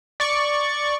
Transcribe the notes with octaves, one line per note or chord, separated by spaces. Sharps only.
D5 C#6